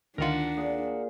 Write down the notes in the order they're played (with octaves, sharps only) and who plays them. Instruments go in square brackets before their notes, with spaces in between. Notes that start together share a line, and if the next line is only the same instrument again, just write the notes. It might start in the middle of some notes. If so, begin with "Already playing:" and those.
[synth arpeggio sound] D2 D#3 F4 [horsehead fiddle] D4 [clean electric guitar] A#4 F#5
[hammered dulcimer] A#2 G#4